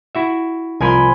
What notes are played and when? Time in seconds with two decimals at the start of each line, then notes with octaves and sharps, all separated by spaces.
0.15 E4 F#4 E5
0.81 C2 F3 A#4 G#5 B5 C6